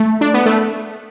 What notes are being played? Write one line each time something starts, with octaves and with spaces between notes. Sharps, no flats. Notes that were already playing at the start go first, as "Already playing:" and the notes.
Already playing: A3
D4
B3
A3